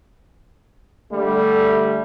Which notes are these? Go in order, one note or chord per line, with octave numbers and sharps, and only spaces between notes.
D3 G3 A3